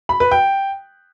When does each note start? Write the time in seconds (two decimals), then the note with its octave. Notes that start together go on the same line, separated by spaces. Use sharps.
0.09 B5
0.20 B4
0.31 G5